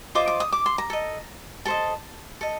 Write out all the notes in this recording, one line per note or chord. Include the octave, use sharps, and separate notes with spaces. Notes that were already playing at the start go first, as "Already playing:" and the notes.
F4 C5 D#5 D6
D6
D#6
D6
C6
A#5
A4 D#5
A4 C5 D#5 A5
A4 D#5